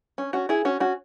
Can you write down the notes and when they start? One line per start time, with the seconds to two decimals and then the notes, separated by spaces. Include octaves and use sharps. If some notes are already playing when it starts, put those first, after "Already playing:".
0.18 C#4
0.33 C#4 F#4
0.49 E4 G#4
0.65 C#4 F#4
0.80 C#4 F#4